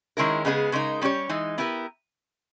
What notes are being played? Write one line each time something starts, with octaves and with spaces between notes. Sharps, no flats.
D#3 G#3 C#4 E4 A#4
C#3 G#3 B3 D#4 G#4
C#3 G#3 D#4 A#4
G3 C#4 G4 C#5
E3 G#3 D#4
B3 E4 G4 A#4